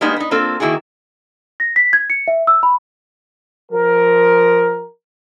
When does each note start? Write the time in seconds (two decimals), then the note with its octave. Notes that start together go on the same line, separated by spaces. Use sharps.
0.01 G3 G#3 A#3 B3 D#4
0.16 B3 D#4
0.31 A#3 C4 F4 A4
0.60 D#3 A#3 E4 F#4 G#4
1.60 A#6
1.76 B6
1.93 G#6
2.10 C#7
2.28 E5
2.47 E6
2.63 B5
3.72 F3 A#4